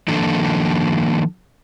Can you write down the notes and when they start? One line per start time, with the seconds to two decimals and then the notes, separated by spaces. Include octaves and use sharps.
0.08 D#3 F3 A#3 D4 A4